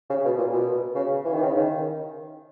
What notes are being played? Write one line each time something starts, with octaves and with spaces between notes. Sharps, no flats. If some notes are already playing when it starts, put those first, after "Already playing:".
C#3
B2
A#2
B2
C#3
E3
D#3
C#3
D#3